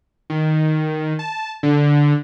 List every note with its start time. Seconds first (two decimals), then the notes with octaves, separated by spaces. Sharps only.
0.30 D#3
1.19 A5
1.63 D3